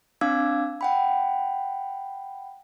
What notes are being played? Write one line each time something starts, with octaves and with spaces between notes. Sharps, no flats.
C4 D4 F5 D6 E6 G#6
F#5 G5 B5